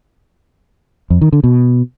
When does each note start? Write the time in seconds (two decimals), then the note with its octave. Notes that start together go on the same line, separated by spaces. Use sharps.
1.10 F2
1.21 D#3
1.33 D3
1.44 B2